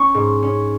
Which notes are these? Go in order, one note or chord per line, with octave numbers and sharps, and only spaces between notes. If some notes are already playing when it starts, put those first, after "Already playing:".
Already playing: C#4 C#6
G#2
C#4